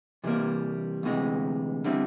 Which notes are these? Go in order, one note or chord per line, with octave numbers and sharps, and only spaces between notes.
C3 E3 G3 A#3
D2 C3 E3 G#3
D3 G3 C4 E4